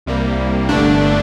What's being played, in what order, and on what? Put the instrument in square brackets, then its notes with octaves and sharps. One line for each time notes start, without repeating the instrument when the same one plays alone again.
[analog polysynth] C2 C3 G3 A#3
G1 G2 D3 A3 D4